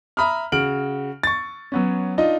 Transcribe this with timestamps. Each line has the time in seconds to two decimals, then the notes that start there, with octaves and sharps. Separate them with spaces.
0.17 E5 A#5 B5 D#6 F6
0.52 C#3 F#4 F6 D7 F#7
1.23 C#6 A6
1.72 F#3 B3 C#4
2.18 D4 D#4 F4 D#5